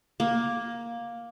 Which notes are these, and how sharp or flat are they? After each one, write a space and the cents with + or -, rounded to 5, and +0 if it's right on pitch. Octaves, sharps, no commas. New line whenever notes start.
A#3 +10